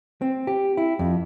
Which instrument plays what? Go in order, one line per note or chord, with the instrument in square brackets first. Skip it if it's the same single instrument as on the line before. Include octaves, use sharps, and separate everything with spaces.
[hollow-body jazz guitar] C4
G4
E4
F2